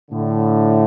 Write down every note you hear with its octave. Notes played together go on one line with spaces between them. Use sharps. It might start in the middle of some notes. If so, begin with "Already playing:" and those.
A2 D3